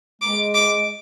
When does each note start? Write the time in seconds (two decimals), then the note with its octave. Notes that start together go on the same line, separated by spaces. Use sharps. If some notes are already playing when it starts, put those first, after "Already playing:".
0.22 G#3 D6
0.55 D6